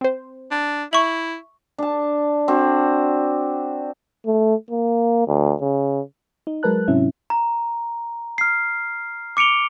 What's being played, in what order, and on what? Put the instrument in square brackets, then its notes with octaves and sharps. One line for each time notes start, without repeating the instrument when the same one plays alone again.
[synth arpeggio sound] C4 C5
[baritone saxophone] D4
[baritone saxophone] E4 [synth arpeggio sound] E5 [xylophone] C#6 F#7
[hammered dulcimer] D4 A5
C4 D4 F#4
[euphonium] A3
A#3
D2
C#3
[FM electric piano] D#4
F#3 G#3 A#4 B4 A5 F#6
G#2 C3 F#3 C#4 E4
[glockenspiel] A#5
F6 C7
D6 C#7 D7 F7 G7